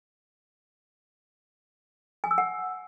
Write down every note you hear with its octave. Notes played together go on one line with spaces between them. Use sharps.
G#5
E6
F#5